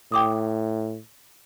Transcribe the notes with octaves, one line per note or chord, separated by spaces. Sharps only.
A2 G5 D6 D#6